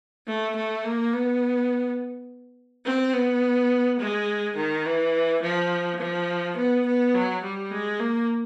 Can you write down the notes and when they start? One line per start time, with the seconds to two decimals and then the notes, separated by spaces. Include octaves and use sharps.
0.27 A3
0.56 A3
0.84 A#3
1.13 B3
2.85 C4
3.14 B3
4.00 G#3
4.56 D#3
4.85 E3
5.42 F3
6.00 F3
6.57 B3
6.86 B3
7.14 F#3
7.43 G3
7.71 G#3
8.00 A#3